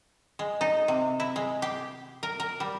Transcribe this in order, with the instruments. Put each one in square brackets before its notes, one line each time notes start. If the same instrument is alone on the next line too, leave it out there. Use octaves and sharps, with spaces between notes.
[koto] G#3
D#4
C3
E4
G#3
G4
A#4
A#4
G3